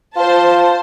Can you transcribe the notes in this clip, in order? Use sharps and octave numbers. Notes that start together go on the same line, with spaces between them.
F4 C5 A5